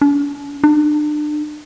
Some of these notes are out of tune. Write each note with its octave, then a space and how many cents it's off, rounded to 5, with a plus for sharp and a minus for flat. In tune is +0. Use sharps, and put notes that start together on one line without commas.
D4 -45
D4 +35